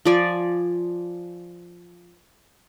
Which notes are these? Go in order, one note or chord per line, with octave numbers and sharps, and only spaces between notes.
F3 D5 G#5